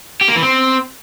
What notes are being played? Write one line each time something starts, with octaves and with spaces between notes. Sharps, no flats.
G4
A#3
E3
C4